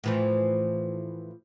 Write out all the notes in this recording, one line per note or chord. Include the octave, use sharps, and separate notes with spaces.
A2 E3 F3